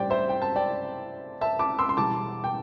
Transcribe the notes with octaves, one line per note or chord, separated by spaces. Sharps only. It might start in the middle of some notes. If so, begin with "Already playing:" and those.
Already playing: A1 G2 G3 G4 C5 D5 G5
C5 E5
G5
A5
D5 G5
E5 A5
A5 D6
C6 E6
C6
E1 E2 E3 G3 A5 D6
G5